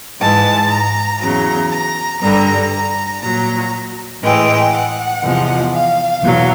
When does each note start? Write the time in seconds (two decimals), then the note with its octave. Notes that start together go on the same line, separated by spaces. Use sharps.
0.19 G#2 E3 G#3 A5
0.70 A#5
1.20 E2 C#3 F#3 A#5
1.71 A#5
2.21 G2 D3 G3 A#5
2.72 A#5
3.21 A#2 F#3 A#5
4.22 A2 E3 G#3 G5
4.72 F#5
5.23 E2 C3 F3 G#3
5.73 F5
6.23 E2 B2 F#3